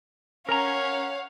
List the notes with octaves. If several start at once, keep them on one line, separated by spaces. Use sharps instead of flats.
C#4 A#4 C#5 F5 F#5 A#5